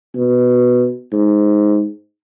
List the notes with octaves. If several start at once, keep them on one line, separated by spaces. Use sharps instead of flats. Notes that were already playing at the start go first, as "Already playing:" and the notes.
B2
G#2